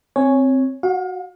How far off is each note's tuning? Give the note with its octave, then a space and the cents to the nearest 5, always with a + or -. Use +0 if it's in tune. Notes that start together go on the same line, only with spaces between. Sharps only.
C4 +5 C#5 +0 G#5 +0
F#4 +0 F5 +35